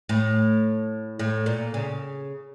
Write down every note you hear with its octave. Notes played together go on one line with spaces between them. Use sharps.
A2
A2
A#2
C#3